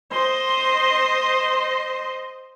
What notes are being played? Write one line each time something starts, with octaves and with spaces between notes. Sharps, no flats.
C5 D#5 C6